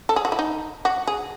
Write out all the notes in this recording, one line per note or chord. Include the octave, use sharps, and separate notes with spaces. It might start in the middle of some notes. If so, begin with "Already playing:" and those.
A4
G#4
F#4
E4
D#4
F#4
G#4